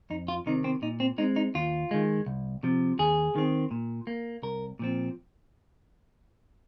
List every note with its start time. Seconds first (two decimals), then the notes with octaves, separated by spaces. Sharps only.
0.10 F2 D#4
0.28 F4
0.46 C3 D#3 C4 D#4
0.64 C4
0.82 A#2 D#4
1.00 C4
1.18 G#3 C4 D#4
1.36 D#4
1.55 D#2 F4
1.91 D#3 G#3
2.26 C2
2.63 C3 F3
2.99 D#2 G#4
3.36 D#3 C4
3.71 A#2
4.07 A#3
4.42 C2 A#4
4.79 A#2 F3 C4